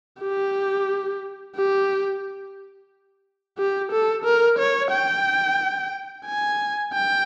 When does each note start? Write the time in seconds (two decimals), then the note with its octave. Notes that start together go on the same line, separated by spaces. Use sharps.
0.21 G4
1.56 G4
3.58 G4
3.92 A4
4.25 A#4
4.59 C#5
4.92 G5
6.26 G#5
6.93 G5